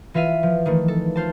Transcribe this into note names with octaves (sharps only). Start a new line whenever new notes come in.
E3 F4 E5 F5 D#7
F3
D#3 E3 A3
A4
F4 C5 A5